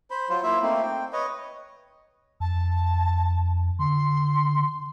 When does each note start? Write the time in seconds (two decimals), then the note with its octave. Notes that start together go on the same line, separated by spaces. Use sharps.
0.10 C5 B5
0.29 F#3 F4 C5
0.43 A#3 E4 F4 E5
0.62 A3 A#3 C4 D#4
0.82 G5
1.13 B4 C#5 D#5
2.40 F2 A5
3.79 D3 C6